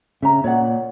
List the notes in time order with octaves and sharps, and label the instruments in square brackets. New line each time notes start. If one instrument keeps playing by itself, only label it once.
[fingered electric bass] C#3 [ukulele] E5 A#5
[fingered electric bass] A#2 [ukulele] C#5 D5 F#5